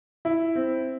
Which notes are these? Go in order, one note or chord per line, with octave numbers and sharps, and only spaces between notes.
E4
C4